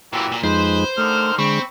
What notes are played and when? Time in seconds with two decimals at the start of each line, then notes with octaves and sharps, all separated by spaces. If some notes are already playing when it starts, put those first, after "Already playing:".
0.13 A#2 E3 F#3 E4 G4
0.32 A#2
0.43 F2 G#3 D#4 B4 C5
0.98 D3 D#3 A3 F6
1.39 D3 G#3 C4 B5 C#6